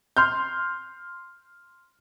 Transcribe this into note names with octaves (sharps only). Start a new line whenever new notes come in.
C6 F6 G6